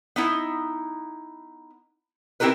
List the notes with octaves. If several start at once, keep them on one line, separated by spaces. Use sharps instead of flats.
B3 D#4 E4
C4 E4 G4 A#4 B4